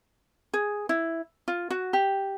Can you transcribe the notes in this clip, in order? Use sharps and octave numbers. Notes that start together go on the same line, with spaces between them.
G#4
E4
F4
F#4
G4